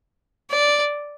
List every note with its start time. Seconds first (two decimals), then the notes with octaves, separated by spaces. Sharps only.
0.50 D5